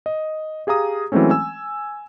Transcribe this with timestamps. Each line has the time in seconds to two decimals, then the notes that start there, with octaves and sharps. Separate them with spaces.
0.06 D#5
0.67 G4 G#4 F5 A#5 D#6
1.12 E3 F#3 G#3 A3 C4 C#4
1.31 G#5 E6